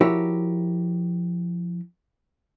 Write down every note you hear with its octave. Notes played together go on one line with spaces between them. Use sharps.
F3 E4 F#4 G4 A#4 C#5